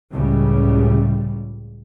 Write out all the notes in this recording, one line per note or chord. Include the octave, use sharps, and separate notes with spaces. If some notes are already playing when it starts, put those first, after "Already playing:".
C#2 A2 C#3 G3